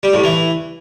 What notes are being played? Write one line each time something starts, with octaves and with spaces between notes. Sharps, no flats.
G3
A2
E3